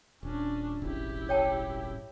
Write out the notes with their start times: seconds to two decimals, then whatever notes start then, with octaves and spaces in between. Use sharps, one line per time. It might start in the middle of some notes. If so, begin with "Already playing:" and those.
0.23 D#1 C#4 D4
0.82 D#1 G#1 C#3 E4 G4
1.29 C#5 G5 A5